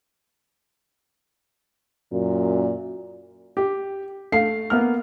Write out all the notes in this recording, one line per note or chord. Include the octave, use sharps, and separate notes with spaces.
F#2 A#2
G4
A3 F5 C7
A#3 B3 F6